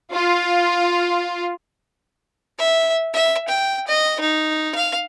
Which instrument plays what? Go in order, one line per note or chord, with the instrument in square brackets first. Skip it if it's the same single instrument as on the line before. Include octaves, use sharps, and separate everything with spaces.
[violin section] F4
[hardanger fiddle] E5
E5
G5
D#5
D#4
F5